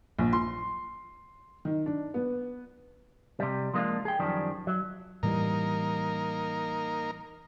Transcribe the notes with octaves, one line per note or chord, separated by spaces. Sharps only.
A#1
C6
D#3
D4
B3
C3 G3
F3 G#3 A#3 C4 D4 F4
G#4 G5
F#2 D#3 F3 G3 D4
F#3
A2 E3 G3 A#3 D#4 A#4